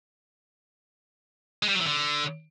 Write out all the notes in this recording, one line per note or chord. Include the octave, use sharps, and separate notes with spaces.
G#3
G3
F#3
E3
D3